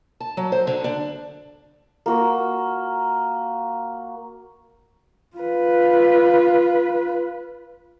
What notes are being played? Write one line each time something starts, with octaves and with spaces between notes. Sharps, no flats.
A5
F#3
C5
D3
D4
A#3 F#4
F4 B4